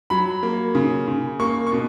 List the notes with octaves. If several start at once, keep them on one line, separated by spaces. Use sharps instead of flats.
F#3 B5
A#3
C#3
C#3
A#3 C#6
C#6
B2